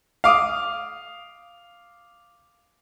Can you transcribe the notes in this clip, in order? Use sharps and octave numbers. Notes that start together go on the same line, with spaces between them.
F5 D6 D#6